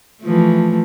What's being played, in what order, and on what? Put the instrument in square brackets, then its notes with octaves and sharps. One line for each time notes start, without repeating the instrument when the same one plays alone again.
[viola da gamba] E3 F3 A3